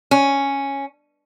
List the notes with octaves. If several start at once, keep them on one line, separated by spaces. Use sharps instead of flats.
C#4